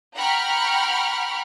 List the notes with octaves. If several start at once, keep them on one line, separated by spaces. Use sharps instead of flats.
F#5 G5 A#5 B5 C#6 F6